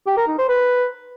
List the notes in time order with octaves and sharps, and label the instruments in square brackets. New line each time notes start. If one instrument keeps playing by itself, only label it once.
[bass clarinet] G4
A#4
D#4
C5
B4